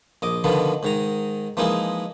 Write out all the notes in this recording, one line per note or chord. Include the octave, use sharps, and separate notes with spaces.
A#1 D#5 D6
B2 D3 D#3 F3 B3
G#2 D#3 A#5
E3 F3 G#3 A#3 D#4 E4